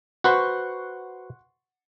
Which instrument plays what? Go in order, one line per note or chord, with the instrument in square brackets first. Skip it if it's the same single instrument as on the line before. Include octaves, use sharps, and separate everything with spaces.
[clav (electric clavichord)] F#4 B4 C5 [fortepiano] F#5 C6 C#6